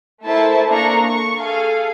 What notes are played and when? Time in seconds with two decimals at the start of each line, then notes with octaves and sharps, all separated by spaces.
0.24 A3 E4 A#4 C5 E5 A5
0.69 A#3 D4 A4 A#5 C#6
1.02 C#6
1.40 G#4 A4 F5